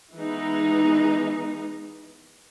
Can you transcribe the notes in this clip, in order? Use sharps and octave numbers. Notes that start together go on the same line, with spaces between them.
E3 G#3 B3 D#4